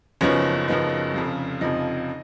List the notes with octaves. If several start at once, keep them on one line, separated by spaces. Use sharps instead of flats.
F#1 F#2 F3 B3 C#4 D#4 C#5
F#1 F#2 F3 B3 D#4
F1 F2 C#3 F3
F1 F2 C#3 F3 D#4 D#5